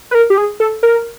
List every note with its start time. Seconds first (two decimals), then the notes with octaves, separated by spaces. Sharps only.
0.11 B4
0.15 A#4
0.30 G4
0.38 G#4
0.60 A4
0.83 A#4